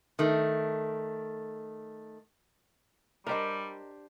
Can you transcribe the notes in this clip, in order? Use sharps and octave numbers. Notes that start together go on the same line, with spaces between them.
D#3 A3
G3 D4 G4 A#4 C5 D#5